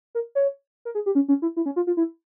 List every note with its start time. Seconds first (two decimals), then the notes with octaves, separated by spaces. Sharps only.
0.15 A#4
0.35 C#5
0.85 A#4
0.95 G#4
1.06 G4
1.15 C#4
1.28 C#4
1.42 E4
1.57 E4
1.66 C#4
1.76 F4
1.87 F4
1.97 E4